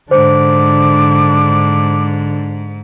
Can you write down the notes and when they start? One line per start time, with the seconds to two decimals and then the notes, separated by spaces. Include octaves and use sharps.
0.11 G#2 D3 D4 C5 D6